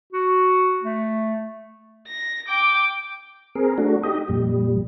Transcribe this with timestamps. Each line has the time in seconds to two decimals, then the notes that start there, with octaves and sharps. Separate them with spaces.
0.13 F#4
0.83 A3
2.07 A#6
2.48 G5 D6
3.55 C4 G#4 A#4
3.78 A3 D4 F#4
4.03 D#4 G4 D#5
4.28 F2 A#2 G3